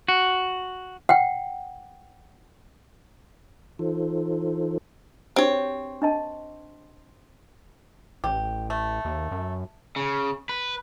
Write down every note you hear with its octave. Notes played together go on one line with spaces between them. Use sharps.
F#4
F#5 G5
E3 D#4 F4 A4 C5
C4 D4 F#4 G4 C#5
D4 D#5 A5
A1 G4
A3
D#2
F#2
C#3
B4